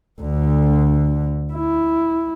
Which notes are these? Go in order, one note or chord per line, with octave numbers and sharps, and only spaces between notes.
D2 D3
E4